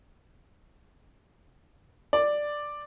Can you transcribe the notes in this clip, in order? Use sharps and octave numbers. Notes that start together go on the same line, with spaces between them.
D5